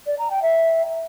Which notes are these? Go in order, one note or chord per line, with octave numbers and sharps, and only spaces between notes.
D5
A#5
G5
E5